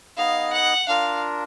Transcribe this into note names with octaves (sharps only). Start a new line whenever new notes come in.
B3 D#4 G#4 D#5 F5
F#5
D4 F4 A#4 F5